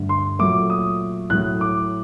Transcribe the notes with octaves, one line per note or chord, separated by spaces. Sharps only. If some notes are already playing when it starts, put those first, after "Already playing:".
Already playing: G2 D3 A3
C6
A#2 F#3 A3 D6
D#6
A2 F#3 A3 F#6
D6